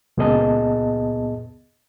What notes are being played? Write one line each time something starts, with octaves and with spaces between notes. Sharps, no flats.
C#2 A#2 B3 G#4 D#5 A5